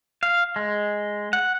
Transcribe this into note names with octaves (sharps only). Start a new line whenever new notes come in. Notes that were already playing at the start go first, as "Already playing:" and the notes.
F5
G#3
F#5